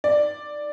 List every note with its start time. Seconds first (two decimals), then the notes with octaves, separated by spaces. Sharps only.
0.04 D5